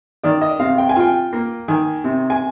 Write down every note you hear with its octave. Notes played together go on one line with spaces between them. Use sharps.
D#3 D5
D#5
C3 F5
G5
G#5
F4 G5
A#3
D#3 G#5
C3
G#5